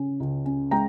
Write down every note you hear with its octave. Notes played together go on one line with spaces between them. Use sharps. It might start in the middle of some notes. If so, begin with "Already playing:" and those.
Already playing: C#3 C#4
C#2
C#4
G#3 G5 A#5